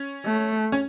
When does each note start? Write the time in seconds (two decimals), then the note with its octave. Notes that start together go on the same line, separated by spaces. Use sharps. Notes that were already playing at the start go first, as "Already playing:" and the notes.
Already playing: C#4
0.25 A3
0.72 C#4